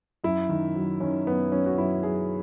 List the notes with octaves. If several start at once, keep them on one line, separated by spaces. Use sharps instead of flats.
F#2 E4
D#3
F#3
D#3 C#4
F#2 B3
F#3 C#4
F#4
F#2 E4
F#3 G#4